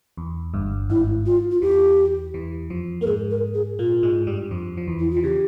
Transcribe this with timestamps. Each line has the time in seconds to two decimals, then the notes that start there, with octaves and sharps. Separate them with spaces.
0.17 E2
0.54 G1 G2
0.90 G#1 G#2 E4
1.26 F4
1.52 F4
1.62 E2 E3 G4
2.34 E2 E3
2.70 F2 F3
3.01 A#3 A#4
3.06 G#2 G#3 G#4
3.31 A#4
3.54 G#4
3.79 A#2 A#3 F4
4.03 G#2 G#3
4.27 G2 G3
4.51 F2 F3
4.77 F3
4.87 E2 E3
4.99 E4
5.11 F4
5.17 E3
5.23 C#3 G4